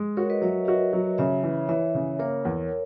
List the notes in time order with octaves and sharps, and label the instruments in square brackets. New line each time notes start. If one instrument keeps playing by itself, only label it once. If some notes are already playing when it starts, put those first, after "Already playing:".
Already playing: [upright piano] G#3
[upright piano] F#4 [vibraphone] A#4 C#5
[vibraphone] B4 D#5
[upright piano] F#3 [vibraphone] C#5 E5
[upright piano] F#4 [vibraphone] B4 D#5
[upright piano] F#3
[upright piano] C#3 [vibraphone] C#5 E5
[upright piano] E3
[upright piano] E3 [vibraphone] C#5 E5
[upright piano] C#3
[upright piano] A#3 [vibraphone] A#4 C#5
[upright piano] E2